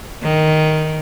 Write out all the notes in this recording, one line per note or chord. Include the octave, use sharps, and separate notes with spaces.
D#3